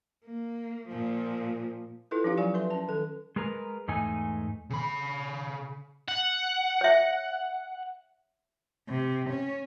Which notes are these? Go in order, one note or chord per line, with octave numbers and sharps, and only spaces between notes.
A#3
A#2 F3
E4 F4 A4 B4
F3 C#4 D#4 G4 F5
F#3 F5 G#5 C#6
A4 B4 E5 C6
C#4 A5
D#3 A4
G#3 G#4 A#4 B4
E2 G#2 A3 D#4 G#5
C#3 B5
F#5
C#5 E5
C3
C#4